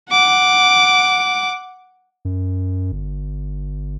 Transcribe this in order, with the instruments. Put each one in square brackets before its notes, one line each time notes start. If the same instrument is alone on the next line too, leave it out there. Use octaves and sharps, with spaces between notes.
[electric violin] F#5 D6
[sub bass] F#2
G1